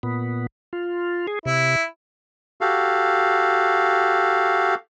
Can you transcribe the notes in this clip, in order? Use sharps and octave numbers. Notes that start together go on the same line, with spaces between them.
A#2 B3
F4
G#4
C3 E4
F#4 G4 A4 F5